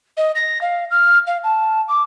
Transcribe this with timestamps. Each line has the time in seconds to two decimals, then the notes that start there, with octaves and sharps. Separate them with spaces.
0.17 D#5
0.35 A#6
0.61 F5
0.91 F6
1.27 F5
1.44 A5
1.88 D6